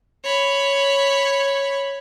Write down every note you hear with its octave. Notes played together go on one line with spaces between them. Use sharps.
C#5 B5